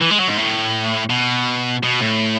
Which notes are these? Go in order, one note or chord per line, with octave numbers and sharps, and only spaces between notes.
E3
G#3
F#3
G#2
A2
B2
B2
A2